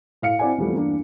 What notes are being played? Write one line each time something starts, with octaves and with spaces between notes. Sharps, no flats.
A2 F5 C#7
C4 E4 D5 F#5 G#5
E2 E3 F3 G3 A3 B3
E2 G2 A#3 D4